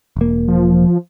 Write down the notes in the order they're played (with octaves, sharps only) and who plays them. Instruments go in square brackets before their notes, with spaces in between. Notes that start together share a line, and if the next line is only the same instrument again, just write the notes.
[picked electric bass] E1 A#3
[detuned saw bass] F3